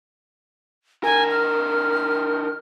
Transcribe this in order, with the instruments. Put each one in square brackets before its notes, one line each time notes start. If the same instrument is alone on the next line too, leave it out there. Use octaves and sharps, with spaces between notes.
[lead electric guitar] D3 A#4 [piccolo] G#5
[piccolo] F6